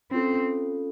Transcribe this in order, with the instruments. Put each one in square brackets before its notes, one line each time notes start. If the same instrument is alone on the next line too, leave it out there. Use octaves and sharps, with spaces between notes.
[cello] C4 [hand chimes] C#4 F4 A4